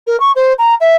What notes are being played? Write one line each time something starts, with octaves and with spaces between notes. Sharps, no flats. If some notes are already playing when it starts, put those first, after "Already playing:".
A#4
C#6
C5
A#5
E5